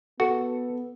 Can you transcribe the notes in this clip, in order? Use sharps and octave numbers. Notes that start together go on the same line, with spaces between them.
B3 F#4 A4